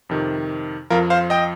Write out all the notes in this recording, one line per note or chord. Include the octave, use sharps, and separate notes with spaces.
F2 C3 D#3
F2 F3 F4 A#4
C5 F5
D#5 G5